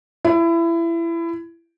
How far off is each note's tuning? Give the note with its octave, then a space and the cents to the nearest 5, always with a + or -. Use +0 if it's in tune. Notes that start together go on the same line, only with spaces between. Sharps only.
E4 +25